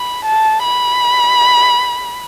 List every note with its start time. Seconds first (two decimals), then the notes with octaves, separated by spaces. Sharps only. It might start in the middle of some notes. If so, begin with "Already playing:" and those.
Already playing: B5
0.25 A5
0.64 B5